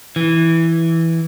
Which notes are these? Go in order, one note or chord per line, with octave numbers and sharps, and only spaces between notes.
E3